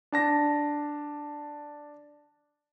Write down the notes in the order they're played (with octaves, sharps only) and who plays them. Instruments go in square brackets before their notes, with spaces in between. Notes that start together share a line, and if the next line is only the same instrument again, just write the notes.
[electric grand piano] D4 A5 A#6